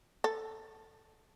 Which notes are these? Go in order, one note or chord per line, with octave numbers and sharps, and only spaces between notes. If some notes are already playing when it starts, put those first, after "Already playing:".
A4